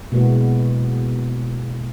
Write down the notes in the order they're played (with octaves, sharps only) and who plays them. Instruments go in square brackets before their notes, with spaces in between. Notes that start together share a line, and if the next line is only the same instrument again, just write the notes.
[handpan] B2 G#3 A#3 B3 E4 F#4